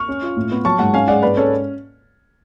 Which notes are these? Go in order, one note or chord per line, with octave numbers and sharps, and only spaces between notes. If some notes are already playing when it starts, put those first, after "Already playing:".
Already playing: C#6 F6
C#4
F4
A2
B3
F#3 A5 C#6
G#2 F#5 A5
C#4 F5 G#5
G#3 D5 F#5
G#2 B4 D5
C#4 A4 C#5